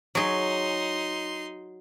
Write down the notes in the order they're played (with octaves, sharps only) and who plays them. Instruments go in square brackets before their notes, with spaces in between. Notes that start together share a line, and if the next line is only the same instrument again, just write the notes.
[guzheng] F#3 G#4 [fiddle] D#4 C6